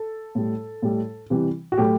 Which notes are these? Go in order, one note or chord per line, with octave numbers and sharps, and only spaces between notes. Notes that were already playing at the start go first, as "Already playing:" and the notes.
Already playing: A4
A2 G3
A2 G3
C3 E3 G3
F#4
A2 F#3 A3 G4